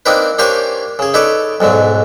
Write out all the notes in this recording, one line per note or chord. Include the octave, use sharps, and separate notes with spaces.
A#3 C4 D4 D#4 A#4 B4
A#3 D4 G4 C5 C#5 G#5
C#3 G#4
D#4 A4 B4 C#5 D5
B1 G#2 D3 F#3